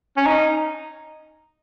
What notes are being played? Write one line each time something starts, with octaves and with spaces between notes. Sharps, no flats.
C#4
D#4